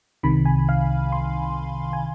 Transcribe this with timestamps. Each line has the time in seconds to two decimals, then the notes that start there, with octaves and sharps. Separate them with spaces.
0.23 C2 C3 D#3 B5
0.45 G#5
0.69 F5
1.12 C6
1.93 G#5